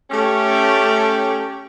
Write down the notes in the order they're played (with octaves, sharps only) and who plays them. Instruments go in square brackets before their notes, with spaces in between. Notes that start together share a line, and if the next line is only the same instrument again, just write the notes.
[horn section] A3 C#4 G4